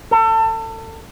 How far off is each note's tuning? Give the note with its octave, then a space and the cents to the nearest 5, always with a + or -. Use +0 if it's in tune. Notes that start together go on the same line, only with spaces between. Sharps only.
A4 +30